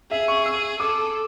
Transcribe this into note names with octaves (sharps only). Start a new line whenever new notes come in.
G#4 E5
C#6
E6
A4 D6